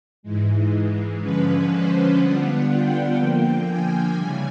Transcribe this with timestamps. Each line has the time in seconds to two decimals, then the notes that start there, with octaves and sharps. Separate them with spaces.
0.23 G#2 E3 G#3
1.21 D3 F3 G#3 C#4 B4
1.70 C5
2.19 D3 G3 B3 D4 F4 F#5
2.68 G5
3.17 D3 F3 A#3
3.66 G#5
4.15 C#3 E3 G3